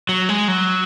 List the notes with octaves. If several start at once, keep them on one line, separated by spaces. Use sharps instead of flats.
F#3
G#3
F#3